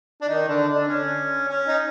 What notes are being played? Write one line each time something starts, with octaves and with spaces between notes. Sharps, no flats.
D4
D#3 D#4
D3 D4
D3 D4
C#4
C#4
D#4